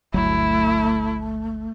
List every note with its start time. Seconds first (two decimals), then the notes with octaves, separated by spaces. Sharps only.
0.14 G1 D2 F#3 A3 E4